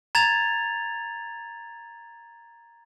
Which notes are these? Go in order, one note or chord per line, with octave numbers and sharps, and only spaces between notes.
A#5 G#6 A6 F7